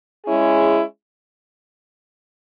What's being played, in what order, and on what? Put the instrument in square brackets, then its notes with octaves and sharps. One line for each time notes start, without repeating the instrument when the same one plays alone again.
[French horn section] G#3 C#4 E4 G#4